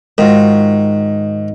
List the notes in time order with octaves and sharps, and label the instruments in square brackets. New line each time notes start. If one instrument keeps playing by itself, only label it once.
[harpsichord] G#2 [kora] D#3 F4 F#4